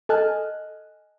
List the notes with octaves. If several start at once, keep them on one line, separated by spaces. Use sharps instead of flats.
A4 D#5 G#5 A5 F6 F#6